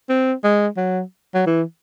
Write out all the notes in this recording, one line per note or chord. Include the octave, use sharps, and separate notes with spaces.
C4
G#3
F#3
F#3
E3